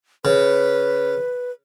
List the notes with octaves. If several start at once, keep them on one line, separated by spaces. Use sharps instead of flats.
C#3 B4